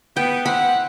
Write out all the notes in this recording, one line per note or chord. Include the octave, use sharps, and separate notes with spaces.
B3 G5
E4 C5 F#5 B5